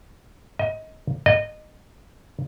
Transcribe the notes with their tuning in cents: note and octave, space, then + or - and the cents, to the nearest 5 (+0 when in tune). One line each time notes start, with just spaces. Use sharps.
D#5 +25
D#5 -20